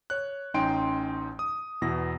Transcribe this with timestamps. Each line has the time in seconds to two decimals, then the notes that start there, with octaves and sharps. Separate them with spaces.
0.10 C#5 F#6
0.54 A1 C#4 D#4 G5 C6 D7
1.39 D#6
1.82 E2 B2 E4 A#6